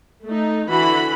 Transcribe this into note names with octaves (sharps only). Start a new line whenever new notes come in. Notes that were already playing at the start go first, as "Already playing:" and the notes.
A3 D#4
D3 E3 F#4 B5